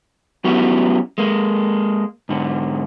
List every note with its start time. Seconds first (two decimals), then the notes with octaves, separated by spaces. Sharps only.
0.44 F#3 B3 C#4 E4 F#4 G4
1.18 G#3 A#3
2.29 G#2 D3